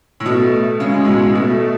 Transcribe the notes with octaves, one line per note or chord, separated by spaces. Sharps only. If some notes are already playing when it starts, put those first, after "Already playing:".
A2
B2 A3
C#3 G#3
A2
B2
B2 A3